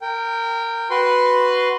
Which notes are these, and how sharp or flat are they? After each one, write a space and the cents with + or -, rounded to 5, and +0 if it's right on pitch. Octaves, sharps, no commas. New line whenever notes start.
A#4 -20 G5 +0
F#4 +0 B4 +0 C6 -10